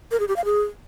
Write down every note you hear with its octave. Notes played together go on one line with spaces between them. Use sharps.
A#4
G#4
G4
F5
G#4